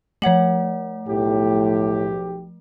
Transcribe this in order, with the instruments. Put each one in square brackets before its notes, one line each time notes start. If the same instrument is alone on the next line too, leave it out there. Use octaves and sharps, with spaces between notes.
[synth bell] F3 A3 [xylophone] C#5 F#5 F#7
[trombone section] B1 G4 [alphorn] A2